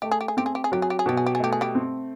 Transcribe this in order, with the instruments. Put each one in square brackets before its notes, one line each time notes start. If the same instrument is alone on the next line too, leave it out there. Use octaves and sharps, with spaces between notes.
[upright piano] A3 [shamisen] G4
[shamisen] G#4
G4
G#4
[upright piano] C4 [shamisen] G4
[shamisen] G#4
G4
G#4
[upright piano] F#3 [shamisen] G4
[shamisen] G#4
G4
G#4
[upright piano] B2 [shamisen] G4
[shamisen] G#4
G4
G#4
[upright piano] A3 [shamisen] G4
[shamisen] G#4
G3 G4
[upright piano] C4